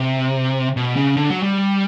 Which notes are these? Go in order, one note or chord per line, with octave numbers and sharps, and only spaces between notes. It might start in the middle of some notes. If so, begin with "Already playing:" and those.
Already playing: C3
B2
C#3
D3
F#3
G3